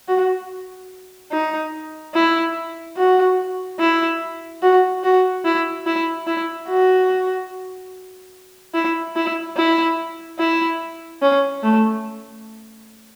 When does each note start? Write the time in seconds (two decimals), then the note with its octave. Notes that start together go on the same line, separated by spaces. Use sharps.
0.08 F#4
1.32 D#4
2.14 E4
2.97 F#4
3.79 E4
4.62 F#4
5.03 F#4
5.45 E4
5.86 E4
6.27 E4
6.68 F#4
8.74 E4
9.16 E4
9.57 E4
10.39 E4
11.22 C#4
11.63 A3